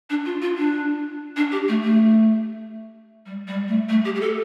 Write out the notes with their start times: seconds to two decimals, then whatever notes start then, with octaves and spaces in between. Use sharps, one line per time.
0.10 D4
0.25 F4
0.42 F4
0.58 D4
1.37 D4
1.52 G4
1.68 A3
1.83 A3
3.26 G3
3.48 G3
3.68 A3
3.89 A3
4.05 G4
4.15 G4
4.21 A4